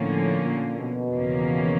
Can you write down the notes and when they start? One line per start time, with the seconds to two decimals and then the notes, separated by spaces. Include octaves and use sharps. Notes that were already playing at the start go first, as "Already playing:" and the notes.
Already playing: A2 D3 F3 A#3 C#4
0.43 A#2
0.78 B2
1.12 E2 C#3 F3 A#3 C#4